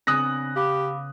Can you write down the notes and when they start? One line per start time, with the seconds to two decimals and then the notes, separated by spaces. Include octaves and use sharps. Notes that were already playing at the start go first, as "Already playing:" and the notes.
0.07 C#3 B3 C4 D4 G#5 D#6 F#6 A#6
0.56 G4 F5 B5 D6